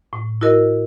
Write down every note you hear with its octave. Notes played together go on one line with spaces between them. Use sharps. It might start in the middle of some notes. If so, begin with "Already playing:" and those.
A2
E4 F#4 A#4 D#5